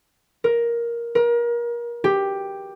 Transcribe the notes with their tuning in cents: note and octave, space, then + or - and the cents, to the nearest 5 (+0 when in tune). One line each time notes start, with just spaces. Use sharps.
A#4 +10
A#4 +30
G4 +5